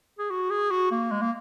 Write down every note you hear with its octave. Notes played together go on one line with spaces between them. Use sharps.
G#4
F#4
G#4
F#4
A#3
G#3
A#3